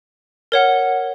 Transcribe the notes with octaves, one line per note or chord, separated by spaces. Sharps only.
A#4 C#5 F#5